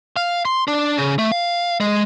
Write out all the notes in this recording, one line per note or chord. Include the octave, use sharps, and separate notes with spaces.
F5
C6
D4
C#3
A3
F5
G#3